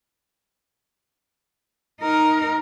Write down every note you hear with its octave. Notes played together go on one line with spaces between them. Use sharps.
D#4 A#4